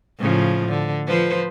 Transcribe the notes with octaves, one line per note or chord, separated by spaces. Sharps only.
A2 C#3 F3
D3
F3 B4 C5